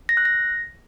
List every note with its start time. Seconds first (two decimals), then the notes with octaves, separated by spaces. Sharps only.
0.09 A#6
0.17 F#6
0.25 A#6